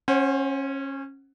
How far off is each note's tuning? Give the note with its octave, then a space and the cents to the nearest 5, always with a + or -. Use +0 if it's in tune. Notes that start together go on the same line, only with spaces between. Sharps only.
C#4 -20 C5 +25 F#5 +10